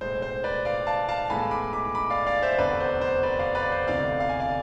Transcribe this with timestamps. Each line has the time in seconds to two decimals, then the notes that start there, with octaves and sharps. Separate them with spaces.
0.01 B1 A2 G#3 C5
0.22 C5
0.44 B4 D5
0.65 D5 F5
0.87 F5 A5
1.08 F5 A5
1.30 A2 E3 G#3 B3 G#5 B5
1.51 B5 D6
1.73 B5 D6
1.95 B5 D6
2.10 D5 F5
2.26 D5 F5
2.42 C5 E5
2.58 F1 E2 D3 B4 D5
2.80 C5
3.01 C5
3.23 B4 D5
3.39 D5 F5
3.55 B4 D5
3.72 C5
3.87 E1 D2 C3 E3 D5 F5
4.20 F5
4.29 G#5
4.40 D5 F5